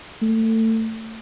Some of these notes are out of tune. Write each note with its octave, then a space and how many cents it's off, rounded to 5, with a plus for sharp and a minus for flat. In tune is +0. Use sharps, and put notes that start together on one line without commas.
A3 +25